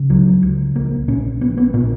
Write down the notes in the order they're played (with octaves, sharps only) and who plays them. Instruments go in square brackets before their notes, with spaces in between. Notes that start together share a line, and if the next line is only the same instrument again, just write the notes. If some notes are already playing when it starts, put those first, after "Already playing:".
Already playing: [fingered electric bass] C#3
C#2 F#3
C#2
A#1 A#3
A#2 C#4
A#1 B3
B3
A#2 B3